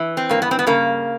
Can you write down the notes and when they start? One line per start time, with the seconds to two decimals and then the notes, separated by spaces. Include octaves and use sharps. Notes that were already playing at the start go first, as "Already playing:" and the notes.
Already playing: E3
0.17 C4
0.29 G2 A#3
0.42 B3
0.51 C4
0.59 B3
0.67 C#3 A#3